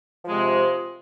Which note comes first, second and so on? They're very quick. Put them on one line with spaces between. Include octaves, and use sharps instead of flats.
F3 G#3 C3